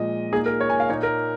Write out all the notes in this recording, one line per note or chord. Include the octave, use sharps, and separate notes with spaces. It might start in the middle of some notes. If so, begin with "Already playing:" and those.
Already playing: A#2 F3 G#3 D#5
A#2 A#3 D#4 G#4
A#4
C#5
G#5
F5
A#2 A#3 D#4 C#5
A#4